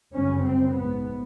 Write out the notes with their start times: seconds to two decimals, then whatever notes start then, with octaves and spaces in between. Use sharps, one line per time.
0.13 G1 F#2 C#3 C#4
0.43 C4
0.73 A#1 G#2 B3